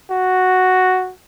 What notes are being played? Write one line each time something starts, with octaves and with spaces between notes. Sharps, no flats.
F#4